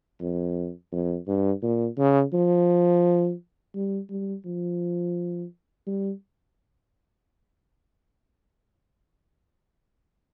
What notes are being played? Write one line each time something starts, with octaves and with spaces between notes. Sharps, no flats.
F2
F2
G2
A#2
C#3
F3
G3
G3
F3
G3